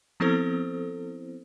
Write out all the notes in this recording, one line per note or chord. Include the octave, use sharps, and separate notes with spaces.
F3 B3 C4 E4 A4 C5